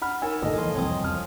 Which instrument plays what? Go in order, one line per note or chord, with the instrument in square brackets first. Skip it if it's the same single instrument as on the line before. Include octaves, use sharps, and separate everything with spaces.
[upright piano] F#5 B5 F6
[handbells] D#4 C#5 E6 [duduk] A#4 [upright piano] G#5
[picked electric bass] G#1 D2 A#2 [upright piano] A4 D#5
[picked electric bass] D#2 G#2 E3 [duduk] F3 [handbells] G#5 C6
[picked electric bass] E1 C2 F2 [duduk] C4 [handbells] C#5 G#5 D#6
[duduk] F3 [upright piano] F6